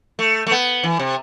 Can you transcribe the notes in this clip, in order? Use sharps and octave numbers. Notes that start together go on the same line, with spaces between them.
A3
A3
B3
E3
C3